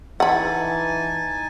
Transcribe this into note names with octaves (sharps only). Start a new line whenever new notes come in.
E3 D#4 F#5 G#5 A5 B5